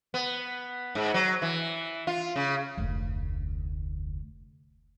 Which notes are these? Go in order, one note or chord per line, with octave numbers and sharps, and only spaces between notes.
B3
G#2
F#3
E3
F4
C#3
F1 D2